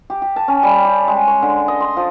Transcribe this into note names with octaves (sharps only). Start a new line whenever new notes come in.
G4
G4
A5
C#4
G3
G4
G#3
C#5
D3
D#5
C6
F3